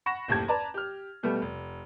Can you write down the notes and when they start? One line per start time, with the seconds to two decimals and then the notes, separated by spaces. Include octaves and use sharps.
0.06 F#5 B5 C#6 A#6 E7
0.28 F#1 D#2 A2 G4 A5 G#6
0.48 B4 D5 A5 A#5
0.74 G4 F6
1.23 B2 G3 A3 B3
1.42 F1